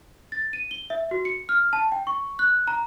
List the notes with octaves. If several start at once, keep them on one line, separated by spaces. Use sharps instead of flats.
A6
D#7
G7
E5
F#4
C#7
F6
A5
G5
C#6
F#6
A#5